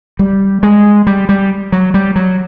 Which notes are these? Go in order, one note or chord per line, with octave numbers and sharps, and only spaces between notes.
G3
G#3
G3
G3
F#3
G3
F#3